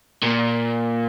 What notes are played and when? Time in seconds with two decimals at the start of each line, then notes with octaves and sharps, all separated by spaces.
0.23 A#2